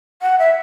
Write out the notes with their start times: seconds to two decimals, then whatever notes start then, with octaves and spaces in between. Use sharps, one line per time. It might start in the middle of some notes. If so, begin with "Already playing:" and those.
0.22 F#5
0.39 E5